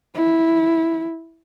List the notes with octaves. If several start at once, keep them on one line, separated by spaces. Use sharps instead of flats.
E4